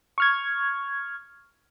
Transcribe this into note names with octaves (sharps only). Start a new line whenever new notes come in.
C#6 F6 G#6